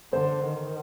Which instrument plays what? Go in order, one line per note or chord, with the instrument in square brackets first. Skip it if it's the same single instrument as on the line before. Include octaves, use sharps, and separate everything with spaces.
[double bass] D3 [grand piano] C5
[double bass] D#3